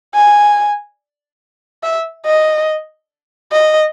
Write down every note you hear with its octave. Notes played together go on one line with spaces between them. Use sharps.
G#5
E5
D#5
D#5